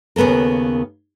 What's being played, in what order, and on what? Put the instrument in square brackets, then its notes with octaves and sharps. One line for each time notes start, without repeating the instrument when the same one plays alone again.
[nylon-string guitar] D#2 C#3 B3 A4 A#4